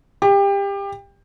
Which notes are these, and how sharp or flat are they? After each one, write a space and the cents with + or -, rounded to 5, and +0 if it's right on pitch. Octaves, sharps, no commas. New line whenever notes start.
G4 +25